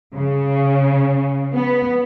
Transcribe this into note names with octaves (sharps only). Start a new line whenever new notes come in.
C#3
B3